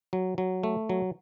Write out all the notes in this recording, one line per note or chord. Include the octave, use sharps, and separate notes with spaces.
F#3
F#3
A3
F#3